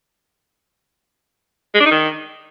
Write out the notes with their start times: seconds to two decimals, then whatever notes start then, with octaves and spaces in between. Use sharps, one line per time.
1.75 G#3
1.80 D4
1.86 D#4
1.91 D#3